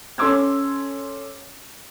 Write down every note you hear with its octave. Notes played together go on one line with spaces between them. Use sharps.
C#4 A4 C6 D6 E6 G#6